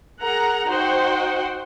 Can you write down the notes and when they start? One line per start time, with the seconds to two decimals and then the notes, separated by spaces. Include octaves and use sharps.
0.21 G#4 A#4 F#5 A#5
0.68 D#4 F#4 C5 F#5 G5